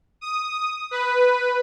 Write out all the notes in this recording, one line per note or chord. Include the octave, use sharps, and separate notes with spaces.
D#6
B4